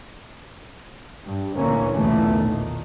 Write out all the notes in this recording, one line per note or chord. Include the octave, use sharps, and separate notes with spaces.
G2
F#1 D2 A#2 E3 A#3 C#4
B1 E2 A#2 E3 A3
A#2 D#3